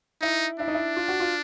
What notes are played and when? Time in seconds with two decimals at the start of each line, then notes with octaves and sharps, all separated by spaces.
0.21 D#4 E4
0.59 D4 E4
0.68 D#4
0.74 E4
0.97 F4
1.08 F#4
1.20 F4